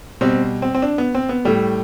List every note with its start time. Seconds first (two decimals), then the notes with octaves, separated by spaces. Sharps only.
0.21 B2 G3 C4
0.62 C4
0.75 C4
0.82 D4
0.98 B3
1.15 C4
1.29 B3
1.45 A2 G3 A3